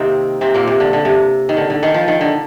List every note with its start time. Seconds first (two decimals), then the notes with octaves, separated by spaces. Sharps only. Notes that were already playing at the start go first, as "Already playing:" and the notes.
Already playing: C3 D#3 A#3 C4 D#4
0.41 C3 C4
0.54 A#2 A#3
0.67 C3
0.80 D3
0.93 D3
1.05 C3
1.49 D#3
1.57 D3
1.70 D3
1.83 D#3
1.94 F3
2.08 D#3
2.21 D3